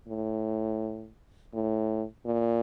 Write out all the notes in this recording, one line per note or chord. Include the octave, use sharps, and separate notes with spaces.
A2
A2
A#2